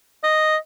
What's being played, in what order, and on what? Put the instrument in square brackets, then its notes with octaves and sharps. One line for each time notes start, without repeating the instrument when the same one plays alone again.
[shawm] D#5